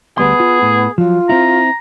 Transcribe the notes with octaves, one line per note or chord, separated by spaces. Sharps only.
D2 G3 B3 G#4 C6
F4
A2
F3 F#3 F4
C4 E4 A#5